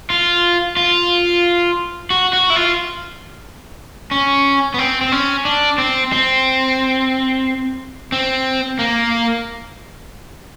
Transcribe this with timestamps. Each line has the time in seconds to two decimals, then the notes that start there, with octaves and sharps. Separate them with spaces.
0.10 F4
0.77 F4
2.10 F#4
2.33 F#4
2.50 E4
2.56 F4
4.11 C#4
4.74 B3
4.79 C4
5.01 C4
5.12 C#4
5.45 D4
5.78 C4
6.12 C4
8.12 C4
8.79 A#3